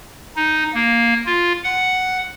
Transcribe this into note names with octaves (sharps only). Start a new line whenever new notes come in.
D#4
A#3
F4
F#5